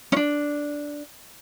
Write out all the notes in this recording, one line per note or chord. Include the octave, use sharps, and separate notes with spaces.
C#4 D4